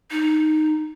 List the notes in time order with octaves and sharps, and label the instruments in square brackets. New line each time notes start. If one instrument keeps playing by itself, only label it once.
[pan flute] D#4